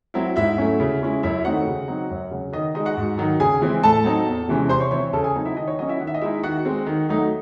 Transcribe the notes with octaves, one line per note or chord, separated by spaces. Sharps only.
F#3 C4 E4
G#2 E4 E5
F#3 A3 C#4
C#3
G#3 C#4 E4
F#2 E4 E5
D#3 A3 C4 D#4 F#4 F#5
C#3
F#3 C4 D#4
F#2
C#3 F#3
D#3 D#5
G#3 D#4 D#5
F#4 F#5
G#2
D#3 F#3
C#3 G#4 G#5
E3 G#3 C4 E4
A2 A4 A5
F#3 C4 D#4
E2
C3 E3 G#3 C#4
C3 C5 C6
C#5 C#6
E3 C4 E4 C#5 C#6
C#3 A4 A5
G#4 G#5
F#3 C4 D#4
E4 E5
D#3 D#5
C#5
F#3 C#4 D#5
E4 E5
D#3 F#5
E5
D#5
G#3 D#4 E4 E5
D#3 F#4 F#5
G#3 C4
D#3
F#3 A3 D#4